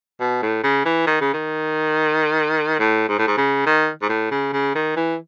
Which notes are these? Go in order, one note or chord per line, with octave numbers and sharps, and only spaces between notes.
B2
A2
C#3
E3
D#3
C#3
D#3
A2
G#2
A2
G#2
C#3
D#3
G#2
A2
C#3
C#3
D#3
E3